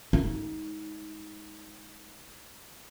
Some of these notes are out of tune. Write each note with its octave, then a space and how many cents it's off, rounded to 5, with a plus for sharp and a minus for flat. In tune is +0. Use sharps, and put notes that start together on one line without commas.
G#3 +0 D#4 +25